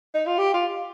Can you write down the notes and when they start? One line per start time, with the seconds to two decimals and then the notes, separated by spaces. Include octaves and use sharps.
0.15 D#4
0.27 F4
0.38 G4
0.54 F4